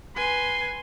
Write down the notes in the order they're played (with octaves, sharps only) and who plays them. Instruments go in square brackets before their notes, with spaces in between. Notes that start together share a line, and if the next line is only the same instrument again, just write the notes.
[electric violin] B4 G#5 [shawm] C6